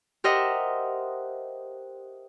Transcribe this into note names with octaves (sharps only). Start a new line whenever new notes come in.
G4 A#4 C5 D#5 E5 F#5